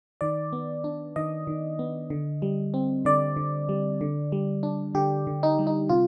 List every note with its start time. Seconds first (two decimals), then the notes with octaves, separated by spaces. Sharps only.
0.21 D#3 D5
0.53 B3
0.84 D4
1.16 D#3 D#5
1.47 D#3
1.79 B3
2.10 D3
2.42 G3
2.74 C4
3.05 D3 D5
3.37 D3
3.69 G3
4.01 D3
4.32 G3
4.63 D4
4.95 D3 G4
5.27 D3
5.43 D#4
5.59 G3
5.67 D#4
5.89 C3 F4